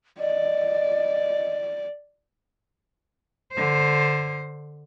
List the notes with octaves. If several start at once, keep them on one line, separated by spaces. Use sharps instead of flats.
D5 D#5
D3 C5